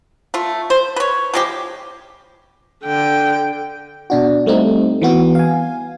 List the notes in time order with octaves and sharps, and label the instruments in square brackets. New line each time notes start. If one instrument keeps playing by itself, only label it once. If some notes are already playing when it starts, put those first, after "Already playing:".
[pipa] A3 F4
C5
B4 C#5
F3 G#3 G4
[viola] D3 G5
[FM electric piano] B2 D4 F#4
G3 A3 C4 D#4
E3 B3 F#4
F5 G#5